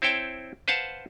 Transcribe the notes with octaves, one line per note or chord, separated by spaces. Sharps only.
C4 E4 C5 C#5 G5 A5
B4 C5 F5 F#5 A5